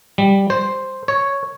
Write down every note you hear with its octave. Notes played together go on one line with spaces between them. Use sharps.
G3
C5
C#5